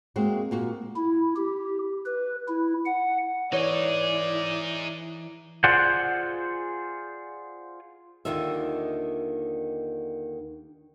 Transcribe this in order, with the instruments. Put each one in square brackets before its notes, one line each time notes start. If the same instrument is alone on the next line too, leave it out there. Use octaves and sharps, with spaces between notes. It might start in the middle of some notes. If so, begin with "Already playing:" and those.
[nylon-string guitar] G#3 A#3 C4 F#4
A#2 A#3 F#4
[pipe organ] E4
G4
B4
E4
F#5
[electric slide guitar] E3 [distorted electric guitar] D#4 G#4 [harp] C#5 [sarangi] D5
[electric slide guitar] F4 G#4 C5 D5 F#5
[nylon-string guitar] D#2 D3 D#3 D#4 F4 E5